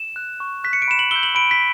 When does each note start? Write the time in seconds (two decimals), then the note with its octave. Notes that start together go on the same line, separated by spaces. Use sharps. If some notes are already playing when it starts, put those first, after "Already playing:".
Already playing: E7
0.16 F#6
0.40 C#6
0.64 F#6 B6
0.73 C#7
0.82 D7
0.88 B5 E7
0.99 F#7
1.11 E6 G6 G7
1.23 F#7
1.35 B5 D7
1.51 B6